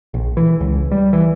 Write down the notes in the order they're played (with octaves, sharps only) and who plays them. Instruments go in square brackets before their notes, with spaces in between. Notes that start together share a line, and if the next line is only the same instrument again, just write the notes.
[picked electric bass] A#1
E3
C#2
G3
E3